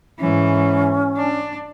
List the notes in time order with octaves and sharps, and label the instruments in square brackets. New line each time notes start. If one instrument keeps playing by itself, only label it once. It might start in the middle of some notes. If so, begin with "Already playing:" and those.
[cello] G#2 E3 [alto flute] C#4
[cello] D4